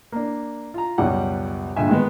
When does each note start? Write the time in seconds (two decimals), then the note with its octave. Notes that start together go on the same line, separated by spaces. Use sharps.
0.12 A#3 D4
0.74 F4 A#5
0.98 C#2 F#2 B2 G3 G4 F#5
1.76 A#1 G2 D3 D#5 E5 G#5
1.89 D#3 G#3 B3